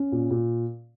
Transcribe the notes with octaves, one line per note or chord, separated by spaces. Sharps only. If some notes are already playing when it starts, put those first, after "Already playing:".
Already playing: C#4
A#2
A#2